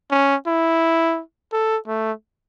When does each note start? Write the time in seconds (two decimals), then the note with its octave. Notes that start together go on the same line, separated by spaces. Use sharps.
0.11 C#4
0.47 E4
1.52 A4
1.87 A3